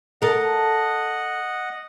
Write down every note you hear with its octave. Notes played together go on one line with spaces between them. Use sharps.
A4 A#4 D#5 F#5